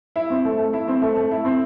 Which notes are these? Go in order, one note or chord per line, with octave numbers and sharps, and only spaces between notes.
E4
C4
A3
A3
E4
C4
A3
A3
E4
C4